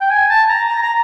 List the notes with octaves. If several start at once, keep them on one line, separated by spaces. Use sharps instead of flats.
G5
G#5
A5
A#5
A#5
A#5